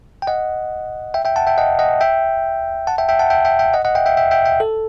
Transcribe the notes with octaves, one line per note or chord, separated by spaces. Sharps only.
G5
D#5 F#5
E5 G5
E5 G5
F#5 A5
E5 G5
D#5 F#5
D#5 F#5
E5 G5
F#5 A5
E5 G5
E5 G5
F#5 A5
E5 G5
E5 G5
E5 G5
D#5 F#5
D#5 F#5
E5 G5
E5 G5
E5 G5
E5 G5
E5 G5
A4